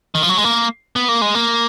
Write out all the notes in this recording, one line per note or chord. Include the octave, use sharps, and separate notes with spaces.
D#3
F3
F#3
G#3
A#3
B3
A#3
G#3
A#3